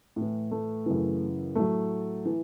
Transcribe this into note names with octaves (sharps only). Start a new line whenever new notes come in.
A2 E3
A3
F#2 C#3 E3
A2 F#3 A3
E3